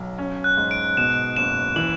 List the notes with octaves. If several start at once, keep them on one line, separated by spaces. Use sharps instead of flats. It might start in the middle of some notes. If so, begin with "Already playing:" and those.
Already playing: B1 F#3
C#4
F#6
G#2
D7
B2 E7
F#1 E7
E3 F#7